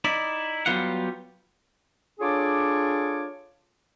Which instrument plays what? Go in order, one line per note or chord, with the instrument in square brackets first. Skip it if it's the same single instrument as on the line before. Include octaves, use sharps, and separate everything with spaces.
[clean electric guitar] D#4 E4 D5
F#3 G3 B3 F4 F5 F#5
[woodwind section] D4 F4 G#4 A4 C#5 D6